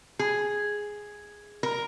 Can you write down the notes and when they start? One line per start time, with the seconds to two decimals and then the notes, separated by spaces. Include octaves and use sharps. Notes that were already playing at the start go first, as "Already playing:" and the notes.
0.19 G#4
1.63 A#4